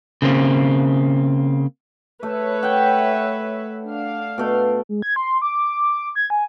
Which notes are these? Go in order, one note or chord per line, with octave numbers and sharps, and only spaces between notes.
C#3 A#3 C4
A3 B4 C#5 E5
F#5 G5
D4 F5
B2 A3
G#3
G#6
C6
D6
G#6
G#5